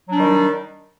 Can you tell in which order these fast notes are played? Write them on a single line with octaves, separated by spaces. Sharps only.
F#3 D4 G3 D#3